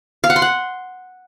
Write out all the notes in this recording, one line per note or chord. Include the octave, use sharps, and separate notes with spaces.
F5
F#5
C6
F#5